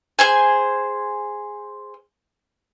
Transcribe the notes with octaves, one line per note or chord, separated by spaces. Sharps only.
G#4 C5 G#5